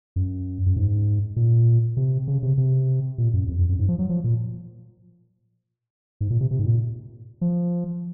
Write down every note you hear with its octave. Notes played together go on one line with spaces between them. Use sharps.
F#2
F#2
G#2
A#2
C3
C#3
C3
C3
A#2
F#2
F2
F2
F#2
G#2
F3
F#3
F3
A#2
G#2
A#2
C3
C3
G#2
A#2
F3